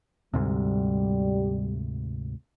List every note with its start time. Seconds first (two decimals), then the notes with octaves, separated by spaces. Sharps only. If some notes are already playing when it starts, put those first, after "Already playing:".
0.34 D2 G#2 C3 G3